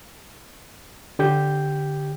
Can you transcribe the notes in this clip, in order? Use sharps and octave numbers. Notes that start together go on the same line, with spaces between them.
D3 G4 G6